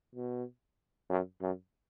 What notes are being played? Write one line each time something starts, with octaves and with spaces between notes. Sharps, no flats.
B2
F#2
F#2